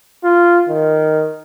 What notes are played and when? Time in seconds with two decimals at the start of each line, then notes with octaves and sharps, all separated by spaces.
0.24 F4
0.69 D#3